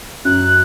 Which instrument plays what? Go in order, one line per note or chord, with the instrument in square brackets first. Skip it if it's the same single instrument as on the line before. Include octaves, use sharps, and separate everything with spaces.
[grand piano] F#2 [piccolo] F#6